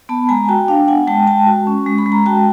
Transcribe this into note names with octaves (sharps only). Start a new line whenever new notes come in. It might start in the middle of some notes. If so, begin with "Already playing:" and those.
B3 A5 B5
G#3 G#5 A#5
F#4 G5 A5
D4 F5 G5
B3 F#5 G#5
G#3 G5 A5
G#3 G5 A5
F#4
C#4
G#3
B5
G#3
A#5
F#4 G5 A5